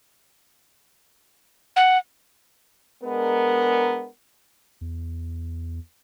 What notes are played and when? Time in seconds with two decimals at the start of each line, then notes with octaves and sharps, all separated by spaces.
1.76 F#5
3.03 G#3 B3 D4 A#4
4.81 E2